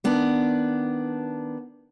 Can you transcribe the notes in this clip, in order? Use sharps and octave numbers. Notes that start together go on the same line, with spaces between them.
D#3 B3 D4